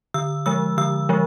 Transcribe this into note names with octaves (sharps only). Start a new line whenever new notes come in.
D3 E6
F3 G#3 E6
D3 E6
F3 G#3